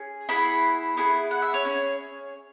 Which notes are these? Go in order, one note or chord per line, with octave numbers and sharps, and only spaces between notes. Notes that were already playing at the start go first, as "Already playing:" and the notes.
Already playing: C#4 G#4
B3 E4 G#4 B5
B3 E4 G#4
F#5
E5
C#5
C#4 E4 G#4